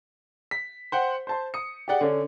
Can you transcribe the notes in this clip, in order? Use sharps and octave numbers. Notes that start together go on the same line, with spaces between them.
B6
C5 F#5 G5
C5 A5 C6
D#6 C#7
G4 G#4 D5 F#5 G5
D3 C#4 D4